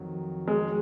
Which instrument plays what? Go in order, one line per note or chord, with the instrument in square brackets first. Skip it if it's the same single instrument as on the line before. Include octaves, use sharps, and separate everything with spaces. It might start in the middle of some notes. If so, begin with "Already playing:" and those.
Already playing: [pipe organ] F2 D#3 F#3
[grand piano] G#3